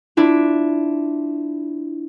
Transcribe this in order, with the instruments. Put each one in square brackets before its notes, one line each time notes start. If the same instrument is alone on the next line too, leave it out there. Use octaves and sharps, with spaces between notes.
[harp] D4 E4 F4